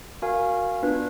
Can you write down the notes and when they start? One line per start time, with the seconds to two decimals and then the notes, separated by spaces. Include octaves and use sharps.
0.22 F#4 A#4 F5 G#5
0.83 B3 D4 F4 B4